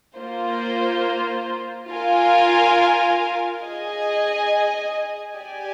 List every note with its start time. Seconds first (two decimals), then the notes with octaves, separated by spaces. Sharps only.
0.16 A#3 F4 C5
1.89 F4 A#4 F5 G#5
3.62 G#4 D#5 G#5
5.35 G4 D5 G#5